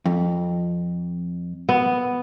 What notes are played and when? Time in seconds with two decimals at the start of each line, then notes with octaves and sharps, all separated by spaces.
0.05 F2
1.69 B3